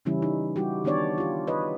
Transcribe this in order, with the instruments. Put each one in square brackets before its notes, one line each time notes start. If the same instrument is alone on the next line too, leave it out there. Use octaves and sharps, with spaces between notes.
[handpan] C#3 E3 G3 C#4 E4
D#4
G3 E4 F#4 G4
D#3 B3 D4 D#4 C#5 D5
F4 G4
B4 C#5 D#5